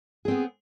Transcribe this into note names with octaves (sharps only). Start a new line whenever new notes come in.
B3 C4 G#4